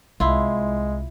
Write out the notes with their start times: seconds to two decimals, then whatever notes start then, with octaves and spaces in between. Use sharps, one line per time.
0.20 C2 G#3 E4 F4